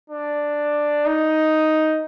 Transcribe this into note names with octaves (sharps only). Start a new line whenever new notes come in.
D4
D#4